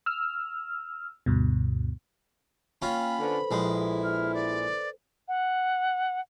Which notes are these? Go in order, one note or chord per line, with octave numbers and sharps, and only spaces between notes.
E6 F6
D2 G2 B2
A#3 C#4 F4 F5 G5 B5
D3 A4 B4 C5
A#1 G#3 E4
F6
D5
F#5